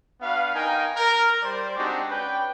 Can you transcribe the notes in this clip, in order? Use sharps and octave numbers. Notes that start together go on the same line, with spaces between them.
B3 D4 F#4 B4 F5
D#4 A#4 F5 G5 G#5
A#4
G3 C5 D5
G#3 C4 D4 D#4 F#4 G4
C#4 B4 D5 G5